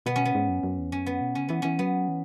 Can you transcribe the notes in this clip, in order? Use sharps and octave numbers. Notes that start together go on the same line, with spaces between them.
B2 B3
C#4
B3
G#2
F#2
F#2
E2
F#2 C#4
B3
B2
C#3 C#4
E3 B3
E3 C#4
F#3 B3
E3